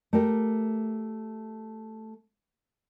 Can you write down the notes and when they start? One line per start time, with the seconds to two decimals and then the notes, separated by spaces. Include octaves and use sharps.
0.13 A3 G4 A#4